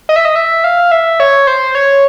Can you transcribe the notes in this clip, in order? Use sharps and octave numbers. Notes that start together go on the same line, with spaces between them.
D#5
E5
D#5
E5
F5
E5
C#5
C5
C#5